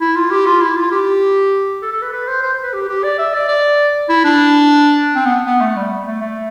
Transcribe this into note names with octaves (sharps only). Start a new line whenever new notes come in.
E4
F4
G4
F4
E4
F4
G4
A4
A4
B4
B4
C5
C5
B4
G4
G4
D5
E5
D5
D5
E4
D4
C4
B3
B3
A3
G3
A3
A3